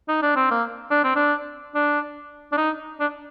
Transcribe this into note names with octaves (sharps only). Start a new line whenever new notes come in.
D#4
D4
C4
A#3
D4
C4
D4
D4
D4
D#4
D4